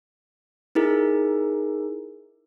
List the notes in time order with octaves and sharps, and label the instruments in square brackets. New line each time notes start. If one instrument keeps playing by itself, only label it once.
[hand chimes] D#4 E4 G#4 A#4